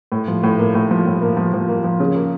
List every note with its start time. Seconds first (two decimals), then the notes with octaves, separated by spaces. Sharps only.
0.12 A2
0.28 F3
0.43 A2
0.59 A#3
0.75 A2
0.91 F3
1.06 A2
1.22 A#3
1.37 F3
1.54 F3
1.69 A#3
1.84 F3
2.00 C#3
2.16 A#3